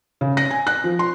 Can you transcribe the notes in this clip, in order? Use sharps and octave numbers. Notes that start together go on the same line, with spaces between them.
C#3
A#6
G#5
F#6
F3
C6